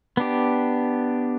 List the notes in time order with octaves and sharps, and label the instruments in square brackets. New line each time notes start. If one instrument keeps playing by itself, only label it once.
[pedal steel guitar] B3 D4 G4